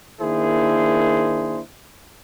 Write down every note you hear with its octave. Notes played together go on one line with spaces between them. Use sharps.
D#3 A#3 D4 E4 G#4 C5